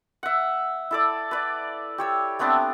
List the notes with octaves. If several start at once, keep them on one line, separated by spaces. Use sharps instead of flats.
E5 F#5
E4 A4 D5
B4 D5
G4 C#5 E6
A3 B3 C4 D4